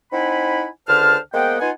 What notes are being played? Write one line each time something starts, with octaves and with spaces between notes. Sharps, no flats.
C4 D#4 E4 F#5 G#5 B5
C#2 D3 C5 A5 F6
G#3 A#3 B3 C5 F#5 G5
B3 D#4 F4 F#5 G#5